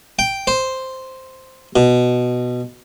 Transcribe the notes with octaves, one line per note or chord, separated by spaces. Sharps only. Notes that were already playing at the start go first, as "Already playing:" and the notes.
G5
C5
B2